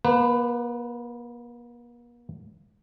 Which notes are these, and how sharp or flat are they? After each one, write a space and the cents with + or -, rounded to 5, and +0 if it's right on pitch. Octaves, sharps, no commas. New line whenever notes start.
A#3 +40 B4 +15